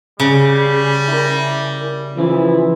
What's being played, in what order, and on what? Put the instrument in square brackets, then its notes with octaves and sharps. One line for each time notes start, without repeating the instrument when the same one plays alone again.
[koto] C#3 [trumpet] G3
[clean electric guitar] E4 A#4
[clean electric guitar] C#3 F3 [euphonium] E3 [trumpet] E4